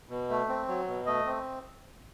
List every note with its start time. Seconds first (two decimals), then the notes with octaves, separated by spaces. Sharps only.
0.09 B2
0.30 A3
0.49 C4
0.68 F#3
0.87 B2
1.06 A3 D#5
1.27 C4